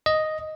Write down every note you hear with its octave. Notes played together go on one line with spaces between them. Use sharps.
D#5